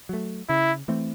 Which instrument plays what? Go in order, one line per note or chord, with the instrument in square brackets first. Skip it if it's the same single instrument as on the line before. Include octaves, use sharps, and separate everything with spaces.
[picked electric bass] F#3 A3
[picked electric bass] C#3 [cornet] E4
[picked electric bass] E3 A3 C4